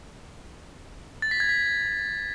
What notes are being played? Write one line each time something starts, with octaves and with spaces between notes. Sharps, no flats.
A6
B6
G#6
B6